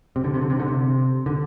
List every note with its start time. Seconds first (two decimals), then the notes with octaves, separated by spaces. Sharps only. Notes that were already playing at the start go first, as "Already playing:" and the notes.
0.16 C3
0.24 D3
0.34 C3
0.41 D3
0.50 C3
0.60 D3
0.68 C3
1.26 D3